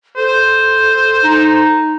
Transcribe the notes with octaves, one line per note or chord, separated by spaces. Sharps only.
A4 C5
D#4